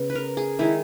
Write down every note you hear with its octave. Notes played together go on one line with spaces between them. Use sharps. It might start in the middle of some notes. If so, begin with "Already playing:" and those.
Already playing: C#3 B3
B4
A#4
G#4
D#3 G#3 D#4 E4